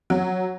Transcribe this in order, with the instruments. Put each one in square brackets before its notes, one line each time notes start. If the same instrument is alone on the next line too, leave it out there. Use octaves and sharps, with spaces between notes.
[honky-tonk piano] F#3